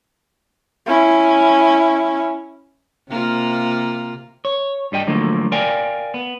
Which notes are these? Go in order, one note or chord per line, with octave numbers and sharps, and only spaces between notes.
C#4 E4
C3 A#3 F4
C#5
G2 G3 D#5 G5
D3 F3 F#3 A3 A#3
A#4 D5 F5 G5 G#5
B3